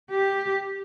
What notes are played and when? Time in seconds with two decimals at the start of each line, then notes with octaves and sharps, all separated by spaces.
0.11 G4